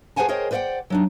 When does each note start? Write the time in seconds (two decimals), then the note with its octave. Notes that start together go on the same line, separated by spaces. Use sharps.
0.16 G#4 B4 C5 F#5 G#5 A5
0.28 G#4 A#4 C5 C#5 D#5 G5
0.51 B4 C5 D5 E5 F#5 G5
0.90 F#3 D4 D#4